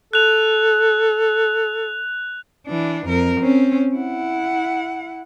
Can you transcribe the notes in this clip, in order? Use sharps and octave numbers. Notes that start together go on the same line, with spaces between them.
A4 F#6 F7
E3 D4
F2 A#4
C4 C#4
E4 F#5